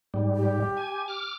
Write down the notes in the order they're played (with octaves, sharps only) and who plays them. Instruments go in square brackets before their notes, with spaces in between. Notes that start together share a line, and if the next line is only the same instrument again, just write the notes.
[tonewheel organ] G#2 G3
[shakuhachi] G4
[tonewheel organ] G#5
D6 F6